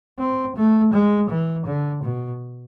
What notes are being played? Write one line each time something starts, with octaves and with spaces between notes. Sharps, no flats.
C4
A3
G#3
E3
D3
B2